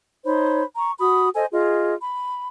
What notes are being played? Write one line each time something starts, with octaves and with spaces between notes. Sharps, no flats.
D#4 C5 C#5 B5
A#5 C#6
F#4 B5 D#6
A4 C5 D#5 G#5
F4 G#4 D#5
B5